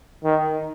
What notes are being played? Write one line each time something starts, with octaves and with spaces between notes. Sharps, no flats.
D#3